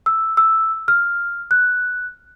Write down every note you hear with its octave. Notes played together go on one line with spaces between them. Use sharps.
E6
E6
F6
F#6